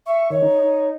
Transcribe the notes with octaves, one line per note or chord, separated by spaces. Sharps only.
E5 C#6
D#3 C#5
D#4
D#4